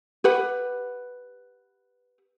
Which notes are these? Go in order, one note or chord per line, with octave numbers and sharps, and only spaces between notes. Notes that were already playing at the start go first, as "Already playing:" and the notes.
G4 B4 F#5